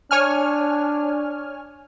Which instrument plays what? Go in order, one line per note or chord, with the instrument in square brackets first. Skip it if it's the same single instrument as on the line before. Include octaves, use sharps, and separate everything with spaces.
[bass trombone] D4 [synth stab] C#5 G#5 F6